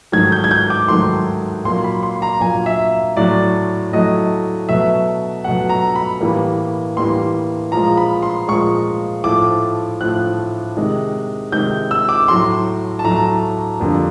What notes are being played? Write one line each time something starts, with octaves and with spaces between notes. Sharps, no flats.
G#2 D#3 F#3 A3 G#6
G6
G#6
G6
D6
G#2 D#3 F#3 A3 C6
A#2 F#3 A#3 C6
B5
C6
A#5
A#2 F#3 A#3 G#5
E5
A2 F#3 A3 D5
A2 F#3 A3 D#5
B2 F#3 A3 E5
B2 F#3 A3 F#5
A#5
B5
A2 E3 G3 A#3
A2 E3 G3 A#3 C6
A#2 F3 G#3 A#5
B5
C6
A#2 F3 G#3 C#6
A2 F3 A3 D6
A2 F3 A3 F#6
C3 D#3 G#3
C3 D#3 G#3 G6
E6
D6
A2 F#3 A3 C6
A5
A2 F#3 A3 A#5
F2 D3 G3 A#3